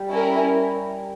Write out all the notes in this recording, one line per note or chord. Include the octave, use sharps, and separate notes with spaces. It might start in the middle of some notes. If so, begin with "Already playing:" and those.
Already playing: G3
C#4 E4 A#4